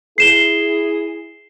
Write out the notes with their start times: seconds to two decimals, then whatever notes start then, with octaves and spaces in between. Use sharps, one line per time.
0.18 E4 G#4 C7 E7 G7